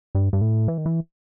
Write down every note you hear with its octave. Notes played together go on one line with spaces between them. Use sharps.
G2
G2
A2
E3
D#3
E3